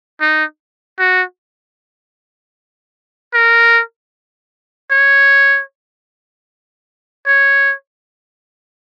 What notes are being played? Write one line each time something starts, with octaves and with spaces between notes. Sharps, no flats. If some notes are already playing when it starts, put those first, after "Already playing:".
D#4
F#4
A#4
C#5
C#5